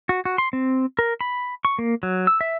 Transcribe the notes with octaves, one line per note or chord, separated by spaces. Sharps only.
F#4
F#4
C6
C4
A#4
B5
C#6
A#3
F#3
E6
E5